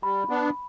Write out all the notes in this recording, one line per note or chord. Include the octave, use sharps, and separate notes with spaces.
G3 B5
B3 D4